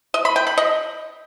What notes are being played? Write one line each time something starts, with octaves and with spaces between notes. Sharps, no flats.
D#5
B5
G5
B5
D#5